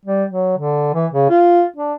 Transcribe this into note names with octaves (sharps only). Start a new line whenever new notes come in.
G3
F#3
D3
E3
C#3
F4
D4